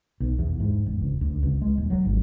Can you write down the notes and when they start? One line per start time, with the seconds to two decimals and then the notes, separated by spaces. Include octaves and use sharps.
0.20 B1
0.39 E2
0.60 G#2
0.86 E1
1.01 C#2
1.21 D2
1.43 C#2
1.62 G#3
1.78 D#1
1.90 F#3
2.05 G#1